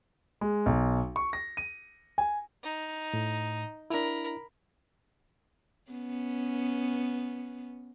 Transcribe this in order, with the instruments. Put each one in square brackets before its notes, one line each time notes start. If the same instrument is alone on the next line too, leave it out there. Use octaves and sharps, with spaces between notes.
[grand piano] G#3
B1
C#6
A#6
D#7
G#5
[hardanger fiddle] D#4
[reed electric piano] A2
[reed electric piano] D4 E4 [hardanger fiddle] A#4 B5
[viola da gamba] B3 C#4